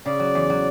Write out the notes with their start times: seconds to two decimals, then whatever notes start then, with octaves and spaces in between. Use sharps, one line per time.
0.06 C#3 D5
0.20 F#3
0.35 E2
0.50 F#3